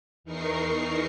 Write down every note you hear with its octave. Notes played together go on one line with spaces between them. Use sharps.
E2 E3 D#4 A#4 C#6 C7